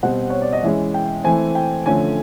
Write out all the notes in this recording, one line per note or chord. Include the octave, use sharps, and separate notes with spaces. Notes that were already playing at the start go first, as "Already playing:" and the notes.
B2 G3 C4 F#5
C#5
D5
D#5
E3 G#3 C#4 E5
G5
E3 A3 C4 G#5
G5
D3 F3 A3 C#4 G#5